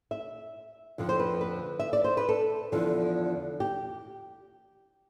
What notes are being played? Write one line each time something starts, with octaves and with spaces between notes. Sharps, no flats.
E5
F2 D3 F3
C5
B4
B4
E5
D5
C5
B4
A4
E2 D3 F3
G4